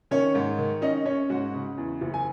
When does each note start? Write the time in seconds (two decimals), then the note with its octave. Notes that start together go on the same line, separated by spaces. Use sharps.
0.11 D#3 C#4 C#5
0.35 G#2
0.58 D#3
0.82 C#4 D#4 D#5
1.05 C#4 C#5
1.29 G#2 F#4 F#5
1.54 C#3
1.78 E2
2.01 F#1
2.14 G#5